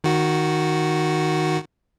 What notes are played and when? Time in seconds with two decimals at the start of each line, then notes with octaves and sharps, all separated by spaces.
0.04 D#3 F#4